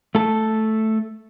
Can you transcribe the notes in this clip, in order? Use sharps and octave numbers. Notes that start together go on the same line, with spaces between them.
A3 A4